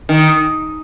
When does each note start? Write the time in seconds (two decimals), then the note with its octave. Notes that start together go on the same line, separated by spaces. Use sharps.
0.09 D#3